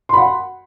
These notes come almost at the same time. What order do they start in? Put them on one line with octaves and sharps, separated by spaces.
C6 B5 F#5